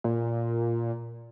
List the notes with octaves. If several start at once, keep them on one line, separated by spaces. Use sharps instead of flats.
A#2